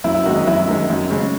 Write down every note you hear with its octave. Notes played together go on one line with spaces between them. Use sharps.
F#2 E4
E4
D#3 G#3 F#4
D#4
F#2 E4
D#3 G#3
F#2
C#3 G#3